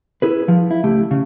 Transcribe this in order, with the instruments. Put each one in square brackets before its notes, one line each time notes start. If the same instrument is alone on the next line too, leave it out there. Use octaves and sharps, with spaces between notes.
[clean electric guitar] E4 G#4 B4
F3
E4
C#2 A3 G4
C#3